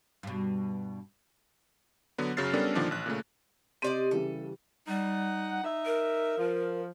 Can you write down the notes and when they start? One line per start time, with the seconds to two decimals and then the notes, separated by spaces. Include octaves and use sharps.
0.23 G2 B2
2.18 D3 F#3 B3
2.37 F#2 C#3 F#3 F6 A6 C7
2.53 G3 B3 C#4 D4 A4 A#4
2.75 A#2 D3 D#3 F3 D4
2.91 A1 F#6
3.06 A#2 C#3 A3
3.82 C3 G4 D5 D#5 C6 D#7
4.11 C#3 E3 G3 A4
4.87 G3 D#4 F#5
5.63 D#4 E5
5.86 A#4
6.37 F3